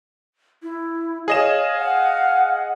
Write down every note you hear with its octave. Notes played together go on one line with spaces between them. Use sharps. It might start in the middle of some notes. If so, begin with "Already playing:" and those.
E4
G#4 C#5 D#5 F5 E7
F#5